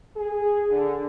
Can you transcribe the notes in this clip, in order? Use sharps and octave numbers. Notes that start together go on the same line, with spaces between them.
G#4
D3